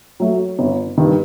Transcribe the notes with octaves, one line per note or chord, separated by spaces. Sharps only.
F#3 A3
G1
G2 D#3